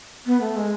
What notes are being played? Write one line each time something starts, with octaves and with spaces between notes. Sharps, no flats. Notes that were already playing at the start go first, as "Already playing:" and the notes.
B3
A3
G#3